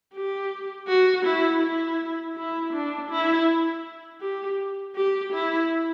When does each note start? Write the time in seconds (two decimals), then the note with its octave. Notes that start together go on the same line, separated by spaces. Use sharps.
0.14 G4
0.88 F#4
1.25 E4
1.63 E4
2.36 E4
2.73 D4
3.11 E4
4.21 G4
4.96 G4
5.32 E4